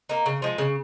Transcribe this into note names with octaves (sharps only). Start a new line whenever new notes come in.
A#3 D#4
C#3
F3 G#3
C#3